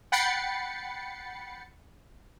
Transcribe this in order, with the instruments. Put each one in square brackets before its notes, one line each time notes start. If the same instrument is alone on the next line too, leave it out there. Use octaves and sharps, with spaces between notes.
[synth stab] F#5 G5 B5 A6 C7 C#7